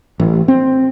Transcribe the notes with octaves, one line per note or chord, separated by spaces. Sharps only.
A1
C4